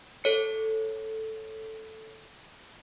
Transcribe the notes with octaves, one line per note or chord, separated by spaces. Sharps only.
A4 C#5 C#7